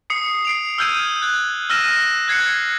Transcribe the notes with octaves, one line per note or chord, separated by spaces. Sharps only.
D#6 C7 C#7
C7 D7 F7
E6 F6 G6 G#6 D#7
F#6 G#6
E6 F6 A#6 D#7 E7
F#6 G#6 C7 C#7